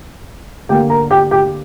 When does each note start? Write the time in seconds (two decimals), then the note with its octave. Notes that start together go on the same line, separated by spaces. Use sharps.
0.69 D3 A#3 G4 G5
0.90 A#4 A#5
1.11 G4 G5
1.31 G4 G5